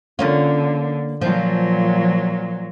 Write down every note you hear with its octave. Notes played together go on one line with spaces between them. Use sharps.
D3 A#3 C#4 F4
A#2 F3 F#3